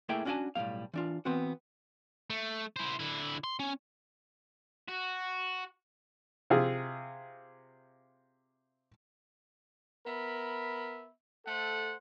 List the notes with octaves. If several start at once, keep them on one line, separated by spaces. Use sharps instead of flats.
A3 A#3 E4 G#4 E5 G5
C#4 D4 F#4 D5 G#5 A5
B1 A2 G3 A#3 F5
E3 D4 F4
E3 B3 C4 F#4
A3
E4 C5
D3 E4
C6
C#4
F#4
C3 F4 G#4
B3 A#4 E5 B5
A3 A4 C5 F#5